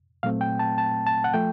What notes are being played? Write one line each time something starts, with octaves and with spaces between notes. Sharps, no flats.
A#2 F#3 A3 C4 F5
G5
A5
A5
A5
F#5
F3 A3 G5